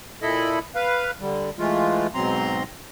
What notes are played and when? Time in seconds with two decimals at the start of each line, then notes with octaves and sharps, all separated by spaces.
0.22 A#2 E4 A4 D#5 B5
0.75 B4 F5
1.21 D3 G3
1.59 E3 G#3 A3 F4
2.14 G#2 B2 F#3 C4 A#5 C6